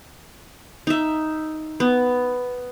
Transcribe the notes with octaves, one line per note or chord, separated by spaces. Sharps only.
D#4 E5
B3